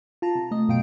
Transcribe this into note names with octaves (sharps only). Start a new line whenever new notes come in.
F4 A5 A#5
C3
A3 D#5
F#2 B2 F4 G5 D7